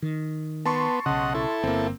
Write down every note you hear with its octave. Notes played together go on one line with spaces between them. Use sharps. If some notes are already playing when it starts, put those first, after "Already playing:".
D#3
B3 A5 C6 C#6
B1 C#3 D#5 F#5
E4 A4
G1 A#3 C4